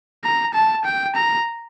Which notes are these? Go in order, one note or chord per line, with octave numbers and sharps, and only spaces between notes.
A#5
A5
G5
A#5